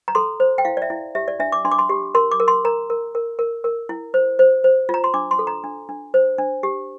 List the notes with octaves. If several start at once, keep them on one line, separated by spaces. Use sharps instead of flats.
A#5
A4 C6
C5
G5
E4 F5
D5
E5
E4
G4 E5
D5
D4 E5
D6
D4 C6
D6
C6
G4
A#4 C6
D6
A#4
C6
A#4 A#5
A#4
A#4
A#4
A#4
E4
C5
C5
C5
F4
A#5
C6
D4 D6
C6
A4
A#5
D4
D4
C5
D4
G4